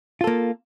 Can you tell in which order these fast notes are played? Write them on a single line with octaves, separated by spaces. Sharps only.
F4 A4 A#3